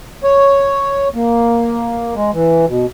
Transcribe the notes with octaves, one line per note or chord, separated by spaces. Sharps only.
C#5
A#3
G#3
E3
B2